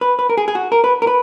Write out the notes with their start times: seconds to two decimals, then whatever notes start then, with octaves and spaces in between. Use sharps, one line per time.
0.01 B4
0.19 B4
0.30 A#4
0.37 G#4
0.48 G#4
0.55 F#4
0.72 A#4
0.84 B4
1.02 A#4
1.07 B4